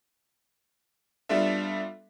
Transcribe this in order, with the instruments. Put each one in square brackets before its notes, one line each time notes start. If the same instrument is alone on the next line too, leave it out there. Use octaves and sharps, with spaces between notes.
[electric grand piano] G3 B3 D4 F4 A4 E5